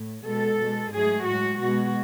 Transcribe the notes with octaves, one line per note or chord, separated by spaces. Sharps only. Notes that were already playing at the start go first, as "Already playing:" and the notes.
Already playing: A2
B2 G#3 A4
B2 G#3
G#2 F#3 A3 G#4
A2 G#3 F#4
B2 G#3 F#4